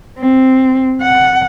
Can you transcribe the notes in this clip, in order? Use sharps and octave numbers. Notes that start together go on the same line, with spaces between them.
C4
F#5